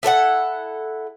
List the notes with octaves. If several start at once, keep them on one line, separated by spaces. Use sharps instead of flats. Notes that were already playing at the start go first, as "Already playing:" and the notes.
E4 A4 B4 F#5